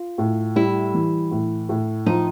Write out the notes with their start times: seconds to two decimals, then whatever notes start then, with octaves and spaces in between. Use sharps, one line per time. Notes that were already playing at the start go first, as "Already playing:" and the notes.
Already playing: F4
0.18 A2
0.56 G3 E4
0.94 E3
1.31 A2
1.69 A2
2.06 F3 D#4